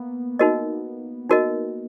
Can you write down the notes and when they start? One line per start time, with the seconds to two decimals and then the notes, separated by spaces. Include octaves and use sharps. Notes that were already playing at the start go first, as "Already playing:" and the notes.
Already playing: A#3 B3
0.39 D#4 F#4 A#4 D#5
1.29 D#4 F#4 A#4 D#5